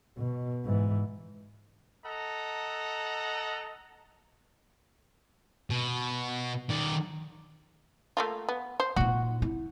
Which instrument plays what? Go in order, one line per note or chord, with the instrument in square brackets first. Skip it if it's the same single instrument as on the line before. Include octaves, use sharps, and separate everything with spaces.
[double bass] B2
G#2 E3
[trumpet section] A4 D#5 F#5 A#5
[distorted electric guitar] B2
D#3 D5
[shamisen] A3 A#3 F4
B3
C5
[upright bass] A#2 D#4 [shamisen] F#4
[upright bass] E4